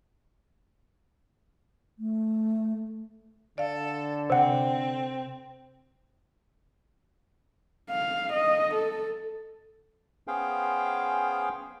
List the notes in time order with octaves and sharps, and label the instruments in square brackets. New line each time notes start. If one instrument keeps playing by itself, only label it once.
[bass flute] A3
[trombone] D3 [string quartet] A4 [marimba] D5 F5
[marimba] C3 [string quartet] C4 [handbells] C5 F#5
[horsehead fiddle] F5
D#5
A4
[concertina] B3 C#4 G#4 C5 F5 G5